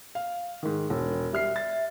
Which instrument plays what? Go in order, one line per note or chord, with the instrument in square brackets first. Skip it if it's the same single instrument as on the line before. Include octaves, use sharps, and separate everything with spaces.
[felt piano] F5
G#2 D#3
E1
[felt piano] G3 F6 C7 [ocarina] E5
[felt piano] A6